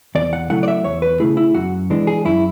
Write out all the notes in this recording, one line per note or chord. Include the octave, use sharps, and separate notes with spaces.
E2 D5
F#5
C#3 F#3 A3 E4 F#5
D5
E5
E2 C#5
B4
C#3 F#3 A3 E4 G#4
E4
F#2 F#4
E3 G#3 D4
G#4
F#2 E4